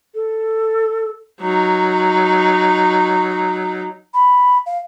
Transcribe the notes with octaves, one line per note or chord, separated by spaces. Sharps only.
A4
F#3 D#4
B5
F5